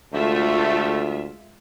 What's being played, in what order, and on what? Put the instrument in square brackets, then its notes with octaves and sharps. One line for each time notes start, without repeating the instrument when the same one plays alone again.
[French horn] D2 [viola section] G#3 F4 E5 [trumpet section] A3